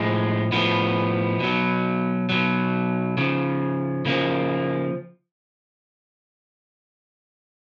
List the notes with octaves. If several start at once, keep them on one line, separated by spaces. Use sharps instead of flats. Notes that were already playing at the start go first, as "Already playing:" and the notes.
Already playing: A2 F3 G#3
A2 F3 B3
B2 F#3
B2 F#3
C#3 F3
C#3 F3 A#3